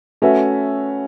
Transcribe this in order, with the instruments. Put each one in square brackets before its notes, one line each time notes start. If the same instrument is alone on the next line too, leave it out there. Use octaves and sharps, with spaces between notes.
[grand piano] A3 F#4 B4 E5 [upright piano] C#4